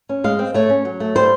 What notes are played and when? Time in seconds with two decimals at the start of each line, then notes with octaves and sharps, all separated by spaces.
0.09 C#4
0.24 G#3 F5
0.39 C4
0.54 A3 C#5
0.69 C#4
0.85 F#3
1.00 A3
1.15 G3 C5